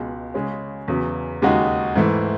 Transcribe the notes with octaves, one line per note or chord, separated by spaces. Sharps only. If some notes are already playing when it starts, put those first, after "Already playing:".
Already playing: C#2 B2 G#3
C#3 G#3 C#4
E2 C#3 F#3
D#2 C#3 G#3 D#4 F#4
G#2 E3 A3 E4